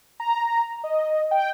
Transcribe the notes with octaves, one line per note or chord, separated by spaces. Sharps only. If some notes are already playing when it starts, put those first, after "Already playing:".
A#5
D#5
G5